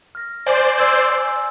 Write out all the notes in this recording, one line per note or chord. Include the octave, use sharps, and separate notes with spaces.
F6 A#6
C5 D5 G#5
C5 D5 C6 E6 G#6
G#5